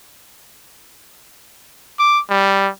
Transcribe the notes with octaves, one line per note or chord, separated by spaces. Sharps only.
D6
G3